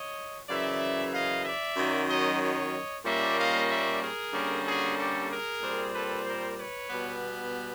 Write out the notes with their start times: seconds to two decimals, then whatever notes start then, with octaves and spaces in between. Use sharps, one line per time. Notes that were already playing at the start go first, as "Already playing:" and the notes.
Already playing: C#5 D#5
0.49 F#2 C#3 E3 D5 E5
1.13 D#5 F5
1.45 D5 E5
1.77 F#2 D#3 F#3
2.09 C#5 D#5
2.41 C#5 D#5
3.05 A#2 G3 A#3 C#4 D5 E5
3.37 D#5 F5
3.69 D5 E5
4.02 G#4 A#4
4.33 D3 G3 A#3 C#4
4.65 F#4 G#4
4.97 G4 A4
5.30 G#4 A#4
5.62 A#2 G3 C4
5.94 A4 B4
6.25 A#4 C5
6.58 B4 C#5
6.90 B2 G3 B3